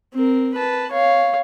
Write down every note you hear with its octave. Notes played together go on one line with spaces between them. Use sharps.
C4 A#4
B4 A5
C#5 F5